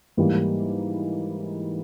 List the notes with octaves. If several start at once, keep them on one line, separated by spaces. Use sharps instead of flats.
G#2 E3 G3 A#3